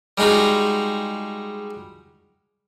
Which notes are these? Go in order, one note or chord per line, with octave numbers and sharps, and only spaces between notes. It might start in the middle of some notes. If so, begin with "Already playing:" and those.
G3 G#3 D#4 F4 F#4